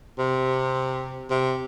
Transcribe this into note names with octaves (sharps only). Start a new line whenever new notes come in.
C3
C3